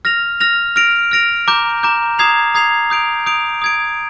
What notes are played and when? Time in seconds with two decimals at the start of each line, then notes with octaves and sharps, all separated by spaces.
0.05 F6 A#6 F7
0.40 F6 A#6 F7
0.76 F6 A#6 D7 F7
1.11 F6 A#6 D7 F7
1.48 A#5 D6 G6
1.83 A#5 D6 G6
2.19 A#5 D#6 G#6 C7 F7
2.55 A#5 D#6 G#6 C7 F7
2.90 D#6 G6 D7 F7
3.26 D#6 G6 D7 F7
3.62 D#6 G#6 D7